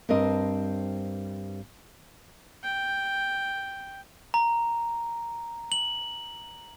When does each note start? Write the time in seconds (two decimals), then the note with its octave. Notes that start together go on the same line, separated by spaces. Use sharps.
0.09 G2 C4 A#4 C5 D#5
2.64 G5
4.34 A#5
5.72 F#7